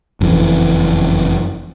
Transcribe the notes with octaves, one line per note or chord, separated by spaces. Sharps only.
F#1 F2 B2 E3